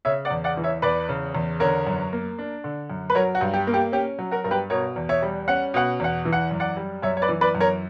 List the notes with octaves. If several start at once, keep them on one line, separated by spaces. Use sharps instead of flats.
C#3 C#5 E5
D5 F#5
E2
D5 F#5
E3
C#5 E5
E2 B4 D5
C#3
E2
D3 A#4 C#5
F#2
A#3
D4
D3
F#2
B4
F#3 A#4 C#5
F#4
G2
G4
A#3
G4
C#4 G4
F#3
F#4 A#4
G2 A#4
G4 B4
B2 A#4 C#5
E2
C#5 E5
G3
C#4 F#5
B2 F#5
E2 F#5
E3
F#5
F#2
D5 F#5
G3
F#2 C#5 E5
C#5
B4 D5
E3
B4 D5
F#2
A#4 C#5